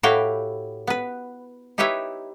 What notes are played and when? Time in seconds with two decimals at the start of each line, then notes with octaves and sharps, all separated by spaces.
0.03 A2 E4 F#4 G4 F5 G5
0.87 B3 B4
1.78 D#4 E4 G4 B4 C#5 E5